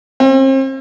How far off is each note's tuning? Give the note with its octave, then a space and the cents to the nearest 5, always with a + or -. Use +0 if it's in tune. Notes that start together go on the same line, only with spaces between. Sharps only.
C4 +40